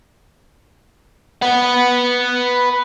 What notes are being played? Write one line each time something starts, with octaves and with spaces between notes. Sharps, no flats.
B4 F#5